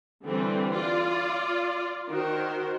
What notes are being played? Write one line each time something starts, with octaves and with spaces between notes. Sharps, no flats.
D3 E3 G3 C4
F4 D5
D#3 F#4 A#4 C5